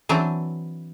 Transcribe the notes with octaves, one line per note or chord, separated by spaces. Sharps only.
E3 F#3 C4 D4